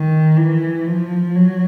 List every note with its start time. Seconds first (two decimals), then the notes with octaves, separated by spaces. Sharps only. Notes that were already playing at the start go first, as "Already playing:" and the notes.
Already playing: D#3
0.37 E3
0.87 F3
1.36 F#3